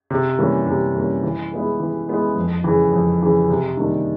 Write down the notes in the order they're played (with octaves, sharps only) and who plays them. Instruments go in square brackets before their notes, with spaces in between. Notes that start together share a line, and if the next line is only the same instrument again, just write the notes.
[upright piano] C3
E3 G3 A#3 C#4
C3
E3 G3 A#3 C#4
E3
G#3 B3 E4
E3
G#3 B3 E4
F2
C#3 E3
F2
C#3 E3
C3
D#3 G3 A#3 D4